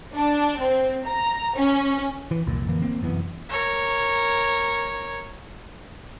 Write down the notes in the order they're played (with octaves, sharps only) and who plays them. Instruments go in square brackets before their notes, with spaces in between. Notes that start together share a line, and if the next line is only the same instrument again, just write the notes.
[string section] D4
C4
A#5
C#4
[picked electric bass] E3
C2 F2 A#2
F2 D3 E3 A#3
A#3 C4
F1 F#2 E3 B3
[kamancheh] A#4 C#5